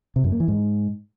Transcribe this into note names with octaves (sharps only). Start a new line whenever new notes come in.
C3
F#2
A#3
E3
G#2